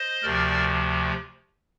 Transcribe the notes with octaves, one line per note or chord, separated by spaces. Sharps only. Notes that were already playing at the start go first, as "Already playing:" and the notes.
Already playing: C5 D#5
D2 C3 F3 A#4 D5